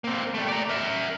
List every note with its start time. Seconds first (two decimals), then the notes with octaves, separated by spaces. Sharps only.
0.04 A#3 C4
0.34 G3 A3
0.48 D5 A#5
0.69 A#4 E5